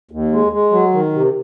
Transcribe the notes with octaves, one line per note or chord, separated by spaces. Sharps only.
D#2
G#3
G#3
F#3
D#3
C3